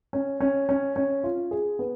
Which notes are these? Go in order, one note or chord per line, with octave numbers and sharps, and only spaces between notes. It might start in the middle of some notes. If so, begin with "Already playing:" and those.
C#4
C#4
C#4
C#4
F4
G#4
B3